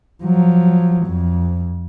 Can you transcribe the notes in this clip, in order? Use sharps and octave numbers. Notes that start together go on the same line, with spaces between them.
F3 F#3
F2